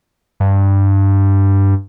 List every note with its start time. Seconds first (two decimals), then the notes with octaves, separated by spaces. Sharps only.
0.40 G2